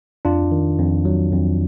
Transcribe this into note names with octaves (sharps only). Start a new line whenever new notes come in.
F2 D4 F4
D#3
F2
F#3
F2